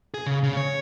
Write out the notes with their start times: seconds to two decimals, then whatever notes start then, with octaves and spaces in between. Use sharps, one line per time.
0.14 G#4
0.27 C#3
0.43 C#3
0.57 C#5